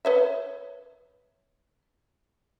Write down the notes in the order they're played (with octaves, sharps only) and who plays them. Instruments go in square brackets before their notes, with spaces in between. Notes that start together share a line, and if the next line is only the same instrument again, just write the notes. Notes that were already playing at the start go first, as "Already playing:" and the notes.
[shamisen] B4 C#5 E5